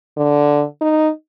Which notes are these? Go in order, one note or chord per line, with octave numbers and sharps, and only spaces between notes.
D3
D#4